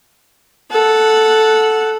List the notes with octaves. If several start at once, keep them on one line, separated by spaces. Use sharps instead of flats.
A4 F#5